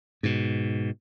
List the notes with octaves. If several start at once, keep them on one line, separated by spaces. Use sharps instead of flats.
G#2 B2